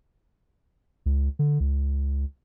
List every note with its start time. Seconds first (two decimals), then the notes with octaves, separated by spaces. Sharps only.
1.06 C#2
1.39 D3
1.60 C#2